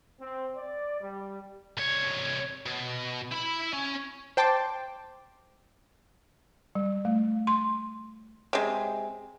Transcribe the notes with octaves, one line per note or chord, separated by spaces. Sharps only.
C4
D5
G3
C2 C#5
B2
E4 B5
C#4
C5 G5 A5 C6 D6
G3
A3
C6
C3 G#3